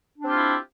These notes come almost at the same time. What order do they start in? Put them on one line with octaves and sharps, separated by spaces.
D4 C4 G4 F4 E4